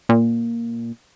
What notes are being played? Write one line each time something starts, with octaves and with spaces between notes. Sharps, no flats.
A#2